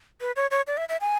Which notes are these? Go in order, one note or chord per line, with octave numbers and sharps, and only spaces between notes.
B4
C#5
C#5
D5
E5
E5
G#5